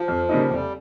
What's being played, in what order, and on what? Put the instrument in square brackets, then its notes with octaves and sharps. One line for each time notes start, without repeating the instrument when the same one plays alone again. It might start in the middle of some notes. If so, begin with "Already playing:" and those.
Already playing: [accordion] F3
[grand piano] F2
C#3 G3 A#3 D#4
[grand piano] F1 [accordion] G3